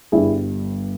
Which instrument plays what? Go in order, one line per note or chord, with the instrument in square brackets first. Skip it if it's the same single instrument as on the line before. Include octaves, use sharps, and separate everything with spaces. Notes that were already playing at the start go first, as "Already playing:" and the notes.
[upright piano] G1 G2 G3 E4 G#4